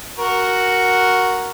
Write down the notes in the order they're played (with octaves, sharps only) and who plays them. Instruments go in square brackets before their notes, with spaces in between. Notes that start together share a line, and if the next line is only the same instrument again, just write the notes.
[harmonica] F#4 A#4